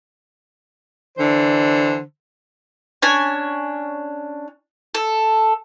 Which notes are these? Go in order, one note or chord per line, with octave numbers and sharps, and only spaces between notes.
D3 E3 D4 C5
C#4 D4 G#5
A4